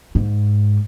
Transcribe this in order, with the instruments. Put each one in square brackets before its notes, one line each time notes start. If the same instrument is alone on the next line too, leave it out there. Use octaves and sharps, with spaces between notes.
[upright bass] G#2